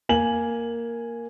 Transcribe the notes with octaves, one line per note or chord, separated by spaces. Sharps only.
A#3 G#5 F#7